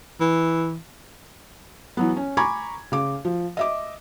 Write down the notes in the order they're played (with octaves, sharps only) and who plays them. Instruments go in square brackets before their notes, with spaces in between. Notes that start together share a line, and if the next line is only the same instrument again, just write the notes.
[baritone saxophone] E3
[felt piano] E3 F#3 B3
C#4
G#5 A#5 B5 C#6 D6 G#6
C#3 D6
F3
D#5 E5 D6